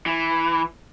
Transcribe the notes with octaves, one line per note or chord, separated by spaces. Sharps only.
E3